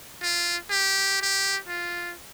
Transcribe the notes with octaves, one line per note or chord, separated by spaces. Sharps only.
F4
G4
G4
F4